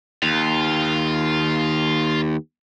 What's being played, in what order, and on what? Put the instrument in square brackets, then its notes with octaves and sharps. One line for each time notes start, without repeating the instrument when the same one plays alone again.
[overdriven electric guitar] D#2 [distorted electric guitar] F4